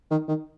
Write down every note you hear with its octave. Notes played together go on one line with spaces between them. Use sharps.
D#3
D#3